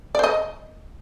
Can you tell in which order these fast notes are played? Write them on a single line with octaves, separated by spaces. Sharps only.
D5 C5 D#5